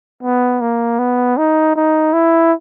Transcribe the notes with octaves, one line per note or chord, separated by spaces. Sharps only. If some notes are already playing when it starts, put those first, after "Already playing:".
B3
A#3
B3
D#4
D#4
E4